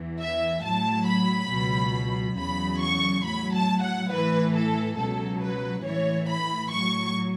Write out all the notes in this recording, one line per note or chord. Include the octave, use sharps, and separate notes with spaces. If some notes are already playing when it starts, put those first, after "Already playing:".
Already playing: E2 E3
E5
A2 F#3 A5
B5
C#2 B2 F#3
E2 C#3 F#3 B5
C#6
A2 F#3 B5
A5
F#5
A2 E3 B4
A4
C#2 B2 F#3 A4
B4
A2 E3 C#5
B5
A2 F#3 C#6